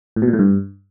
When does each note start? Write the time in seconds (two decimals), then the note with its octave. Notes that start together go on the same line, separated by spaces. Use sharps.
0.16 A2
0.22 B2
0.28 A#2
0.33 A2
0.39 G2